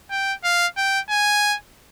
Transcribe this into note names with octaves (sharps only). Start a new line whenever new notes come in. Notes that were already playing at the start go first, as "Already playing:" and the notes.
G5
F5
G5
G#5